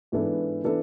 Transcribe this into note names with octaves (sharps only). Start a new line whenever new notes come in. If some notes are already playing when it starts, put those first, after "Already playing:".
G#2 E3 B3 D4 A4
E3 B3 D4 A4